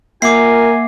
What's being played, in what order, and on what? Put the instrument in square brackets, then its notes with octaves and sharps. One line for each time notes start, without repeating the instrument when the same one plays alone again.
[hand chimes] A#3 E5 F#5 [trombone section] F4 A#4 [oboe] G#5 [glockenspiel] D6 C7